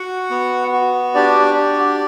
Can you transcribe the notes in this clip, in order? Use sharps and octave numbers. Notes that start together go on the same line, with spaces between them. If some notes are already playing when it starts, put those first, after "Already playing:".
Already playing: F#4 F#5
B3
F#4
D4 G4 D5
G4